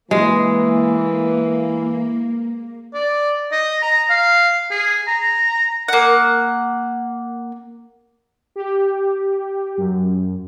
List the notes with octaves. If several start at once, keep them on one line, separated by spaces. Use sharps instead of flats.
E3 G#3 A#3
D5
D#5
A#5
F5
G#4
A#5
A#3 F#5
G4
F#2